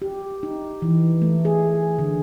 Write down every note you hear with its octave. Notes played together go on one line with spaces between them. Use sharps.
G4
D#4
E3
A3
G#4
D3